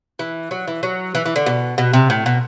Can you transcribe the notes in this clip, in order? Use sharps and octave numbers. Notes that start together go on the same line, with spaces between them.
E3
F#3
E3
F#3
E3
E3
D3
B2
B2
C3
A2
B2